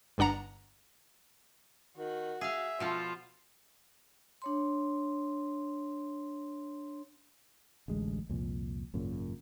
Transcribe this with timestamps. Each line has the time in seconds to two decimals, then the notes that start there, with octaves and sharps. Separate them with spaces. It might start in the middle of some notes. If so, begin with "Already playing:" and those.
0.18 G1 G2 D4 F#5 A#5
1.97 D#3 F#4
2.41 G#4 E5 F5
2.80 B2 F3 F4 A4
4.42 D4 C#5 C6
7.88 A1 D2 G#3
8.29 C2 F2 A#2
8.93 G#1 F#2 A#2 C#3